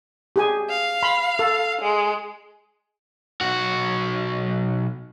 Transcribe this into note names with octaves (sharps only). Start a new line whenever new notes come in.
G4 G#4 G#5
F5
B5 C6
A4
G#3
B1 F#4